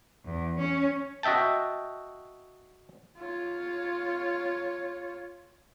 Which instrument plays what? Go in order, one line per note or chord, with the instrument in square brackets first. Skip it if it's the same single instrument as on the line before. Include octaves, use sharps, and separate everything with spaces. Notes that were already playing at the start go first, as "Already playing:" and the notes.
[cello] E2
C#4
[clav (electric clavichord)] F#4 D#5 E5 G5 A5
[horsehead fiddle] F4 C#5